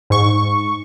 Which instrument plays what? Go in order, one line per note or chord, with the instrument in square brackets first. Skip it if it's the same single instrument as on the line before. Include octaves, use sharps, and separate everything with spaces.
[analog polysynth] G#2 C#6